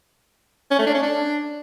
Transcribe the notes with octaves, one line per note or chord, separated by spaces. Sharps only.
C#4
A3
D4
C#4
D4